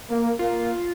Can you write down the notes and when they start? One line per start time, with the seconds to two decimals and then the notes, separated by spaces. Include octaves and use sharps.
0.10 A#3
0.39 A#3 F4